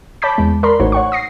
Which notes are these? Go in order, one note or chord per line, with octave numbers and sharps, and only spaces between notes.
C#5 A5 B5 D6 G6 B6
E2 G#3
A#4 D5 B5 C6
A1 A2 D#4 F#4 C5 C#5
C#5 F#5 C#6
D#6 A#6 C7